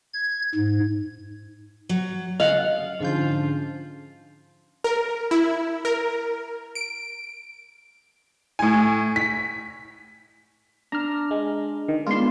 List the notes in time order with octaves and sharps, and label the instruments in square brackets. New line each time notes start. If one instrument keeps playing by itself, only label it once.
[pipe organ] G#6
G#2
[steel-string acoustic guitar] F#3
[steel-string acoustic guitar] C#3 [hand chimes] D#5 [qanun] F5 F#5
[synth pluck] G#2 F3 G6 [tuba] D3 [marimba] C#4 C5 [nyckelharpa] F4
[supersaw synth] A#4
E4
A#4
D7
[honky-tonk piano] A2 G#5
B6
[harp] D4 [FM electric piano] A#5 F6
[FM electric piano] G#3
D#3
[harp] G#3 B3 D4 [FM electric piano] F4 C6